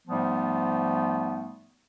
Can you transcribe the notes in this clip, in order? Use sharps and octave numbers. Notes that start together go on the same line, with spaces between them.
G#2 F3 G3 A3 B3